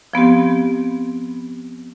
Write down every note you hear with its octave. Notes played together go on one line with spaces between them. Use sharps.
F3 B3 C4 G4